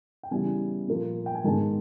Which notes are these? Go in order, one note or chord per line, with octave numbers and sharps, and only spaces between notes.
G5
C#3 E3 G3 B3 G#5
A#2 F3 A#3
G5
G#5
G#2 D#3 G#3 B3 A5